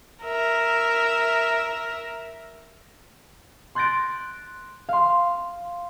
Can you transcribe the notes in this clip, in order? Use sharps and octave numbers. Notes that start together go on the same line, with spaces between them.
A#4 E5
C6 F#6 G6 A6 A#6 D7
F5 C6